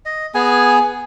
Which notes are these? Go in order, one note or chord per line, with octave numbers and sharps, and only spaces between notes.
D#5
B3 G#4 G#5